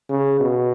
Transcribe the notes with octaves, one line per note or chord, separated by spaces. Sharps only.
C#3
B2